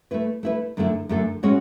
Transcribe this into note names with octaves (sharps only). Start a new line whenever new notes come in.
A3 E4 B4
A3 E4 B4
F#2 D3 A3 E4 A4
F#2 D3 A3 E4 A4
A2 G#3 C#4 F#4 C#5